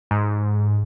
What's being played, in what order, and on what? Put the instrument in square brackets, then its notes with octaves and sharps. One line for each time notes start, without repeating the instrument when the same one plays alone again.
[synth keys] G#2